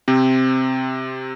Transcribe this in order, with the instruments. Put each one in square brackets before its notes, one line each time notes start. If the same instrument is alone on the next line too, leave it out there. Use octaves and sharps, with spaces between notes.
[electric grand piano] C3 C4